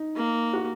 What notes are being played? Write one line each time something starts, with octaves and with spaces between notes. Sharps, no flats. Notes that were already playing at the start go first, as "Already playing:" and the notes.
Already playing: D#4
A#3
F#4